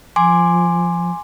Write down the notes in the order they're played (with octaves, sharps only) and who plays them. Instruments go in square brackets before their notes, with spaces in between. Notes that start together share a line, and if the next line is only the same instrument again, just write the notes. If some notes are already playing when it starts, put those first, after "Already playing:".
[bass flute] F3 [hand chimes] G#5 C6 D6